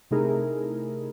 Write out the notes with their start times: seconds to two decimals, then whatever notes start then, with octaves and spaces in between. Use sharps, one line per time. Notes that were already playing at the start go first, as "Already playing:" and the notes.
0.11 C3 A3 D#4 E4 G#4 A#4